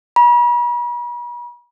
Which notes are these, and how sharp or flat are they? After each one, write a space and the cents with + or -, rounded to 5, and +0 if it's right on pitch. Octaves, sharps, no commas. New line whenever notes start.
B5 -45